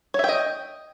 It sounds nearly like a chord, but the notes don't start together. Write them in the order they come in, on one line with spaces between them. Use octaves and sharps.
C#5 E5 G5 D#5